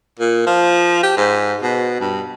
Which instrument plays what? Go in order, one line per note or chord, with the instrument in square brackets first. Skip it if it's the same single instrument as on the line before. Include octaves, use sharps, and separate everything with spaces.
[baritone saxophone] A#2
F3
G4
G#2
B2
G2